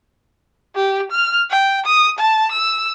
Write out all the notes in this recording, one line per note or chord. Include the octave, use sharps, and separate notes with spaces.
G4
F6
G5
D#6
A5
E6